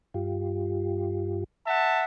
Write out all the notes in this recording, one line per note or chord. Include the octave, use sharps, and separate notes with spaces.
G2 F4 G4
E5 F#5 A5